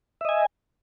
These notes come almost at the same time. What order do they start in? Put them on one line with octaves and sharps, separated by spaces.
E5 D#5 G#5